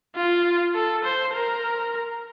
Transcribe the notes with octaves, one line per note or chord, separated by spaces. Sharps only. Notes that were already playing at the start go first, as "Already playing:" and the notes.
F4
A4
C5
A#4